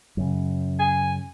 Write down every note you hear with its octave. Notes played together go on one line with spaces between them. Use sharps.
F#2 C#3
G#5